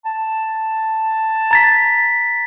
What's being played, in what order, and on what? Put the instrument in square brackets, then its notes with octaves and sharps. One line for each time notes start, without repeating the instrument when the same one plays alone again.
[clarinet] A5
[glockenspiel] A#5 A6 B6